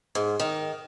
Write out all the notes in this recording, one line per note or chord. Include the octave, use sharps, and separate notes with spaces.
G#2
D#3